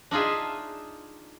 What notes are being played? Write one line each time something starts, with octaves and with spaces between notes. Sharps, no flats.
D4 D#4 F4 G#4 E5